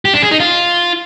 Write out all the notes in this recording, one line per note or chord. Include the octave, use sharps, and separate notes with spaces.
G4
D4
G#4
D#4
F4